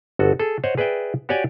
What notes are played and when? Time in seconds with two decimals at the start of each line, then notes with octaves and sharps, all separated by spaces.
0.19 G1 F#4 A4
0.40 G#4 A4
0.64 C5 C#5 D#5 F#5
0.78 G#4 B4 D5 E5 G5
1.29 F#4 G4 C#5 D5 G5 G#5